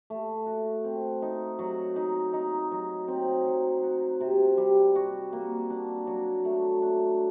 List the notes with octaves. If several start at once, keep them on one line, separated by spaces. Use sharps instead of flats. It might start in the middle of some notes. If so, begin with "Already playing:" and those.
A3
F#4
C4
D#4
F#3
D#4
D#4
F#3
C4
F#3
F#4
C3
G3
F#4
A#3
D4
F#3
A3
D4